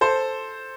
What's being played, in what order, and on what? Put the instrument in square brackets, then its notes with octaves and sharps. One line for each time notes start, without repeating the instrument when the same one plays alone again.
[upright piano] A4 C5